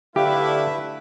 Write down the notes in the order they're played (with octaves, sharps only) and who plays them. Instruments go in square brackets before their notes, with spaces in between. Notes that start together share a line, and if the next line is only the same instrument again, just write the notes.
[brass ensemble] D3 D4 E4 [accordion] A3 B4 E5 [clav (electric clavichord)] G4 [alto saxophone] F5